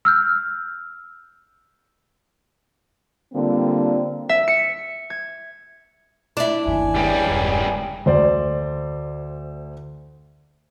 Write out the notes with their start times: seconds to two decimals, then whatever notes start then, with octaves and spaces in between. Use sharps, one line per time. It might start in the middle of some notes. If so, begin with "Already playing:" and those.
0.05 E6 F6 G6
3.34 D3 G3 A#3 C4 F4
4.29 E5
4.48 C#7
5.10 G#6
6.37 D4 E4
6.66 G1 D#2 G#5
6.95 C#2 G3
7.25 E1 G2
8.06 D2 C5 D5